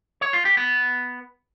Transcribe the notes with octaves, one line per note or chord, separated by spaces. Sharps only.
C#5
F4
G4
B3